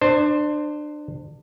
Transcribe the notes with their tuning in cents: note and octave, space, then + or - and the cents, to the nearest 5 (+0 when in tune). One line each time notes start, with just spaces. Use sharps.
D4 +25 C5 +0